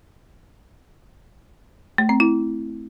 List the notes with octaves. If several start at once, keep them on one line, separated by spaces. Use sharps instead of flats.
A3
C4
E4